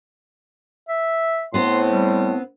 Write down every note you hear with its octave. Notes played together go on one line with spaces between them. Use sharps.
E5
A2 B3 C4 C5 C6
G3